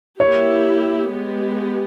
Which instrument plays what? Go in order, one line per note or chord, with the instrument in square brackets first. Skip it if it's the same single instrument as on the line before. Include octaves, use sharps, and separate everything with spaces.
[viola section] A#3 E4 G4 [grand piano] C#5
[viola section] G#3 B3 G4